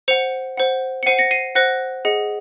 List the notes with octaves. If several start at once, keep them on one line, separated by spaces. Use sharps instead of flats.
C5 F#5 C#7 F7
C5 F#5
C#7
C5 F#5 C7 D#7
A#6 C#7
C7 D#7
C5 F#5 F#6 A#6
G#4 D#5 F#5